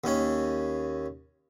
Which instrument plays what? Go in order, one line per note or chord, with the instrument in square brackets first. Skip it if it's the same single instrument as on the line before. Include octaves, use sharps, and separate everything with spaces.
[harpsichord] D#2 C#4